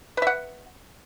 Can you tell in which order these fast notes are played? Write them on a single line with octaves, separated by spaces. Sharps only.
B4 E5 F#5